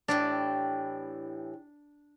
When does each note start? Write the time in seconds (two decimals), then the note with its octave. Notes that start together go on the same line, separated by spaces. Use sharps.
0.08 A2 E3 D4 G4